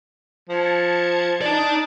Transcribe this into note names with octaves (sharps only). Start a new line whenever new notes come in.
F3 A5 G#6 C#7
D#4 D5 A5